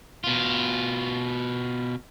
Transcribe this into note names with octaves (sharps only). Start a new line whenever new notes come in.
B2 F4